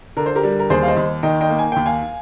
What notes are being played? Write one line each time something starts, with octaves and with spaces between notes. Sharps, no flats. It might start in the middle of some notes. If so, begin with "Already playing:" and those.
D3 A#4
C5
G4 A#4
G3
A#4
D#2 G#4 C5
F5
C5 D#5
D#2
D#3 D#5 G5
D#5 G5
A#3
G#5
D#2 G5
F5 G#5